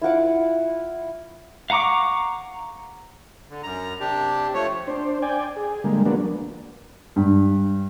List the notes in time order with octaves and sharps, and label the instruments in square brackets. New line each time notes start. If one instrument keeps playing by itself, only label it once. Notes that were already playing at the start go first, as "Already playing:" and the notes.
[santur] E4 F4 F#5 D6
[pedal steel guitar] F5 F#5 A#5 C#6 D6
[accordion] D3
F#2 A#5
C3 D4 G4
F3 A3 C#5
[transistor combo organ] D4 C5
D5 G5 G#5
G#4
D3 G3 G#3 A#3
D3 F3 A#3 B3 D4 F#4
[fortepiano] G2